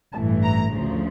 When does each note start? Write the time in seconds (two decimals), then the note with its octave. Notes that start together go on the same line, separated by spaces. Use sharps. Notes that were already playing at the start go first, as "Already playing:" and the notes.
0.14 A1 G2 E3 A3 A5
0.42 A#5
0.71 D2 C#3 F3